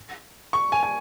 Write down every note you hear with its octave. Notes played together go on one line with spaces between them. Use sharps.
C#6
G#5
G#5